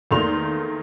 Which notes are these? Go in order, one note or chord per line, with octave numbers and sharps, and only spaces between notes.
E2 D#3 A3 A#3 C6 F7